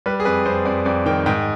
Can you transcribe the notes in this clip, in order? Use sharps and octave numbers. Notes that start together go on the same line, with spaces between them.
G3 B4
G#4
F2 B4
F2 C5
F2 D5
F2 D5
D#3 G5
G#2 G5